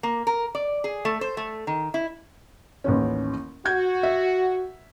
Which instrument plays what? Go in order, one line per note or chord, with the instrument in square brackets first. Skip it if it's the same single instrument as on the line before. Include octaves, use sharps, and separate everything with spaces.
[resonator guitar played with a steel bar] A#3
A#4
D5
G#4
A3
C5
A3
D#3
E4
[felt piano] A1 D#2 C#4
[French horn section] F#4 [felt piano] G6 G#6
[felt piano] E5